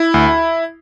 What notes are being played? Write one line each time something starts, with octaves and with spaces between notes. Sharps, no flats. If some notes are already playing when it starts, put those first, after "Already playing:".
Already playing: E4
D2